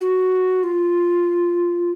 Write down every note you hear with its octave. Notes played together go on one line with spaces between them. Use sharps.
F#4
F4